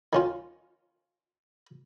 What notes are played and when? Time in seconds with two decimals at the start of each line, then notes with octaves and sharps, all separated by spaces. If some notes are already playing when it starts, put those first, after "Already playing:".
0.13 D#3 C#4 F4